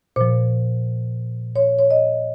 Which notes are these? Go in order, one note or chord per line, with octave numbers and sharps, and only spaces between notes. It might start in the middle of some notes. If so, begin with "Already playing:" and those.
A#2 F3 C5
C#5
C#5
D#5